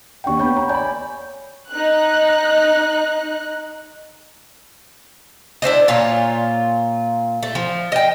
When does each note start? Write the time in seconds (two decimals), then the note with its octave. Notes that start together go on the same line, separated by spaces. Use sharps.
0.24 D#2 D4 F#5 G5 C#6
0.39 B3 C#5 F#5 B5 G6
0.57 C#5 A#5
0.69 D5 G#5 B5 G6
1.71 D#4 F#6
5.62 D4 E4 C5 D#5
5.88 A#2 F4 C#5
7.43 A3
7.55 F3
7.92 D#5 G5